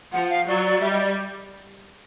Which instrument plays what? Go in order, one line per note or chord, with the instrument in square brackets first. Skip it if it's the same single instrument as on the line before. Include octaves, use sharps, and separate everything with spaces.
[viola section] F3 [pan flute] F#5
[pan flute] F5
[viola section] F#3 [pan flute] D5
[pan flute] D5
[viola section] G3 [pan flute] E5
[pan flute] D#5
D5